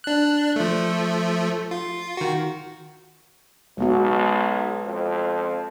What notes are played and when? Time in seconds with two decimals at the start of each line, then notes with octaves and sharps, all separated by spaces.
0.04 D4 F#6
0.56 F3 A3
1.71 F4
2.17 D#3 F#4
3.78 B1 G#3 B3 F#4
4.86 F2